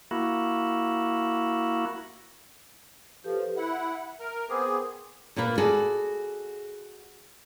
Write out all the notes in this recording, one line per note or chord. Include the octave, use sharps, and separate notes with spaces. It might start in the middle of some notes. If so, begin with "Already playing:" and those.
A#3 E4 F#4
F3 G4 A4 B4
E4 E5 F#5
A#4
B3 C4 G#4 A#4 D6
A#2 A#3 F4 B4
F#4 G#4 A4 D5 F#5